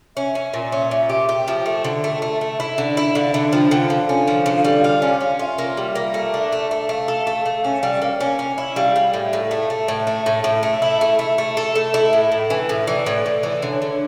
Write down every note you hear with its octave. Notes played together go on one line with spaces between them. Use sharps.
C#4 E5
C#4
A#2
C#4
A#2
G4
G4
F3
A3 E5
D3
A3
A3
A3
E4
D3
E4
D3 F5
D3 E5
F3 G5
D3 G5
D3 F5
C#4
F3
D3
G3
F4
C#4
C#4
F4 E5
A#3
G3
A#3
A3
D4
A3
A3
A3 F5
A4
A3
A3
C#4
G3
A#3
C#4
C#4
E4
G3 F5
G3
A2 E5
A2
A3
A3
A2
A3
A2
A2
A3
E4
A3
A3
A3
A4
A3
E4
A2 E5
A2
E3
A2
E3 D5
A2
A2
E3
D3 C#5
D3